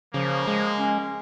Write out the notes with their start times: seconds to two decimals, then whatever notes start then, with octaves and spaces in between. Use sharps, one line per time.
0.14 C#3 F3 A#3
0.48 G#3
0.79 C#4